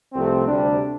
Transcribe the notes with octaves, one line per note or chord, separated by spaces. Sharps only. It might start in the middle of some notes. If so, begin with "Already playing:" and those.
C2 C3 F3 A3 C4
D2 C3 G3 D4